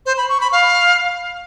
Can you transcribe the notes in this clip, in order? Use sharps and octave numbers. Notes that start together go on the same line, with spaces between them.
C5
B5
C#6
B5
F5